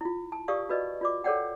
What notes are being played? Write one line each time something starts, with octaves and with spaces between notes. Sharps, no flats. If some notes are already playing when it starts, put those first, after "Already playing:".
E4 F4
A5
G4 A#4 D5 F5 C#6 D#6
F#4 A#4 B4 D5 D#5
F4 D5 D6
A4 A#4 C#5 D5 F#5 G5